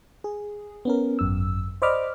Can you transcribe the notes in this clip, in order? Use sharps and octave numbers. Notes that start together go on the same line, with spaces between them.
G#4
B3 C#4 A#4
G#1 F#2 E6
C5 D5 D#5 B5 D6 F6